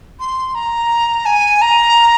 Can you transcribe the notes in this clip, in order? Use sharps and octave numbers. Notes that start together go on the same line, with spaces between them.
C6
A#5
G#5
A#5